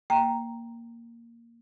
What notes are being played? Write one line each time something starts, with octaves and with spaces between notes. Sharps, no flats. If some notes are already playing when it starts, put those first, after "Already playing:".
A#3 G5 A#5